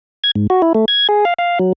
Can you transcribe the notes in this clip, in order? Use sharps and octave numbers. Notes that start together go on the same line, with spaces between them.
G#6
G#2
F#4
E4
A3
G#6
G#4
F5
F5
F#3